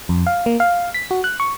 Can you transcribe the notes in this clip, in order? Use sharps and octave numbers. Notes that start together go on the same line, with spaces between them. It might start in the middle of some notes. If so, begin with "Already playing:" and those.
F2
F5
A#3
F5
B6
F#4
F#6
C#6